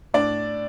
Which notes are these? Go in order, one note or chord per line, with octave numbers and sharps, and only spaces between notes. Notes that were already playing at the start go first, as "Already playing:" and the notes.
A2 D4 D5